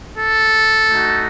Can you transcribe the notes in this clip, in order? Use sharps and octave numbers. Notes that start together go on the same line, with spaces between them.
A4
A3 D#4 F#4